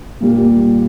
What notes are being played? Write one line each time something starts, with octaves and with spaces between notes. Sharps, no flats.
A#2 G3 A#3